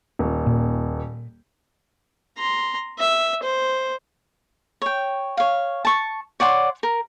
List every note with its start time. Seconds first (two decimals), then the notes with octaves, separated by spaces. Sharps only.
0.19 D#1
0.46 A#2
2.38 A#5 C6
2.98 E5
3.43 C5
4.82 C#5 G5
5.37 C#5 F5
5.85 A5 C#6
6.40 C#5 D5 F#5 C6
6.83 A#4